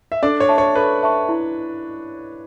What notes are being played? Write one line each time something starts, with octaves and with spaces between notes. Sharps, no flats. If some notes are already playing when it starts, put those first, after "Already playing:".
E5
D4 A4 D5
C#5
E5 A5 C#6
C#5
A4 B4
E5 A5 C#6
E4